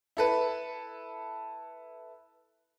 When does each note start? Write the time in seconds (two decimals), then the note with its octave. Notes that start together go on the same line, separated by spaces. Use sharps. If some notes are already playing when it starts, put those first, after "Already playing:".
0.17 E4 A4 B4